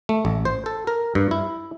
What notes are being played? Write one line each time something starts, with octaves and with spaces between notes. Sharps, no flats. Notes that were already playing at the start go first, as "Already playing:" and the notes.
A3
A1
C5
A4
A#4
G2
E4